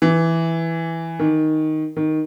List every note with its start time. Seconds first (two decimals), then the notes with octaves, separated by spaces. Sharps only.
0.02 E3
1.19 D#3
1.97 D#3